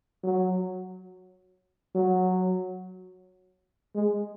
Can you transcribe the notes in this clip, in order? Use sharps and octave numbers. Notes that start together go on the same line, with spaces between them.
F#3
F#3
G#3